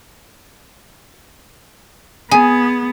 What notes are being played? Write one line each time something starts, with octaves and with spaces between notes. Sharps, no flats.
B3 G#4 G#5